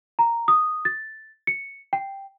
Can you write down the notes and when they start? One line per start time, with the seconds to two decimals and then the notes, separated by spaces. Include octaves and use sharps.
0.19 A#5
0.48 D#6
0.85 A6
1.47 C#7
1.93 G5